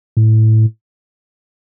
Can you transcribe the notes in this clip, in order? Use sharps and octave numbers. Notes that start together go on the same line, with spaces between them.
A2